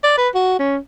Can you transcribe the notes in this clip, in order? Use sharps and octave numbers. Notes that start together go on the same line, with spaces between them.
D5
B4
F#4
C#4